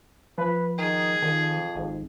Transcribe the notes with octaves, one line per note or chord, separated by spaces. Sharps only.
F3 B4
D#3 G#4
F2 D#3
G#1